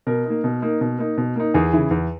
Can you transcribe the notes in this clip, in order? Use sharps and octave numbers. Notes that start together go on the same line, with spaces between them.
B2 A#4
A#3 D#4
B2
A#3 D#4
B2
A#3 D#4
B2
A#3 D#4
E2 G#4
C#3 E3
E2